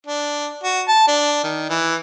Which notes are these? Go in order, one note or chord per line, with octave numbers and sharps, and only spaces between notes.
D4
F#4
A5
D4
D#3
E3